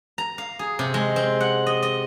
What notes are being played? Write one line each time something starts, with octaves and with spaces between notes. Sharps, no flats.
A#5
F5
G#4
C3
G#3
C4
F#5
D#5
D#5